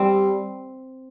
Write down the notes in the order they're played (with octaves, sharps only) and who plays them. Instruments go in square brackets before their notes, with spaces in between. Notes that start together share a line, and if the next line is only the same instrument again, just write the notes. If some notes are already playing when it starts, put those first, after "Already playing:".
Already playing: [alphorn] G3 [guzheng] C4